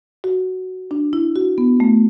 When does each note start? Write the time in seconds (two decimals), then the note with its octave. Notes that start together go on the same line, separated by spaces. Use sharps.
0.24 F#4
0.91 D4
1.13 E4
1.36 F#4
1.58 B3
1.80 A3